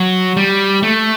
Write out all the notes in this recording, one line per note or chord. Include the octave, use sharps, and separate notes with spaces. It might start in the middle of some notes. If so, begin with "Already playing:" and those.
Already playing: F#3
G3
A3